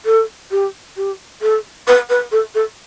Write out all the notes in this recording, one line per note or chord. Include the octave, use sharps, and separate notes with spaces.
A4
G4
G4
A4
B4
B4
A4
A4